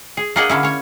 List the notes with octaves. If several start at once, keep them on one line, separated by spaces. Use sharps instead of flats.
G#4
A#3 D4 G#4 D#5 F#5
D3 A#3 C#4 E4
C#4 C#5